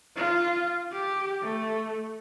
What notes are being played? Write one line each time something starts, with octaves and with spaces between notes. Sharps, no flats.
F4
G4
A3